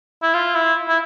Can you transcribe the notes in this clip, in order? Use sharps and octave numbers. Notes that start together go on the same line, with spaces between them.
E4
F4
E4
E4